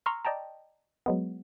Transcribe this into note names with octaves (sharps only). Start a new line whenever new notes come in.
A#5 C6 C#6 E6 F6
D5 D#5 G5 A5 A#5
F#3 G#3 B3